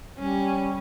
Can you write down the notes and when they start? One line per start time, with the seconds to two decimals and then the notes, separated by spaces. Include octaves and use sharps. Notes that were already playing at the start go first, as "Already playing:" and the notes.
0.19 G3 C#4